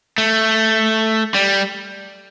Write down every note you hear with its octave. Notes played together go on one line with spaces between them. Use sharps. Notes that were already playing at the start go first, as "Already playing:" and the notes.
A3
G3